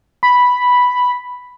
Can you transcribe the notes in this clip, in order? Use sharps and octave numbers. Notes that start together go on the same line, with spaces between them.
B5